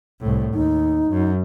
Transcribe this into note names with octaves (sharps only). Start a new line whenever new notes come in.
C2 A2
D#2 D#4
F#2